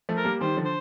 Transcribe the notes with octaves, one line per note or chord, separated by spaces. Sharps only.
F3 A3
A#4
G3 A#3
D#3 G3 C5
D3 F3
C5